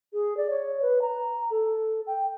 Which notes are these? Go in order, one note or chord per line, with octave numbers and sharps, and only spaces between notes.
G#4
D5
C#5
B4
A#5
A4
G5